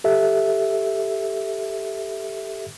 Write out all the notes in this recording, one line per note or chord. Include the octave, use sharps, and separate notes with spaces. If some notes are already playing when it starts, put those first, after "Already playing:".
G4 A4 E5